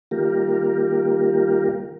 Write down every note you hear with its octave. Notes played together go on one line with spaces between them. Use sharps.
D#3 G3 A#3 F4 G4 A#4